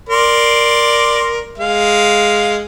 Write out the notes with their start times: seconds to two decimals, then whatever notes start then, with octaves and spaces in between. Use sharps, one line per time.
0.09 A#4 D5 C6
1.58 G#3 F5